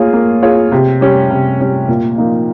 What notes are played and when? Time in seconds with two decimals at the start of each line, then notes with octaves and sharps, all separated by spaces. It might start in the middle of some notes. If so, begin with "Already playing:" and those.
Already playing: A#3 F4 G#4 C#5
0.13 A#3
0.42 F4 G#4 C#5
0.72 C3
1.01 G3 C#4
1.30 C3
1.60 G3 C#4
1.88 A#2
2.18 F3 A#3 D#4